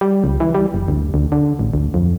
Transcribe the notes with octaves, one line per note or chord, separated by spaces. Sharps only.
G3
C#2
E3
G3
F#1
D2
D2
D3
A1
D2
F2